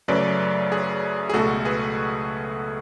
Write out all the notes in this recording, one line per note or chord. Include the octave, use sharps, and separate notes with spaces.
F#2 C#3 F#3 A3 B4 D5
G#4
G#4
C#2 B2 A3 F#4 A4
G#4 B4